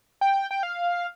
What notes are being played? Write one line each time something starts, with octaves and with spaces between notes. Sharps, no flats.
G5
G5
F5